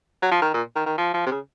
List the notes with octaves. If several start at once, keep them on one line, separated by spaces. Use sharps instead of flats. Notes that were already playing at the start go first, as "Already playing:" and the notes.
F#3
F3
D#3
A#2
D#3
D#3
F3
F3
C3
C#3